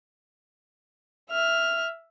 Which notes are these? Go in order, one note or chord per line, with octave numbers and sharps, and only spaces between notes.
E5 F6